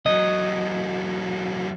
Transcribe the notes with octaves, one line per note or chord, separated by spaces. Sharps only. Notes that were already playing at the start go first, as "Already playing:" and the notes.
E2 F#3 D#5